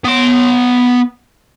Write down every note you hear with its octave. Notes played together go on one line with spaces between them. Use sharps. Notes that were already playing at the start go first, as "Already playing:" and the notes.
B3 C6